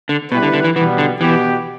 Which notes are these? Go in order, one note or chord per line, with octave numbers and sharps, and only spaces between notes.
D3
B2 G3 E4 G4 B4
D3
D3
E3
B2 E3 G3 B3
D3
B2 E3 B3 G4